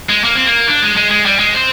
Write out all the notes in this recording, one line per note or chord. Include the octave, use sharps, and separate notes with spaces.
G#3
A#3
C4
A#3
D4
G#3
G#3
G#3
G3
G#3
C4